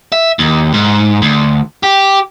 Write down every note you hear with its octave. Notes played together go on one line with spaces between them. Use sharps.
E5
D#2
G#2
D2
G4